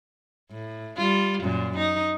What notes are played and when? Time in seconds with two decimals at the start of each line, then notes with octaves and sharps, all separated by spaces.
0.51 A2
0.97 G3 F4
1.42 F#2 A#2
1.77 D#4